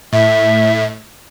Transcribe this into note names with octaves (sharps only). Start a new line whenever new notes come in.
A2 E5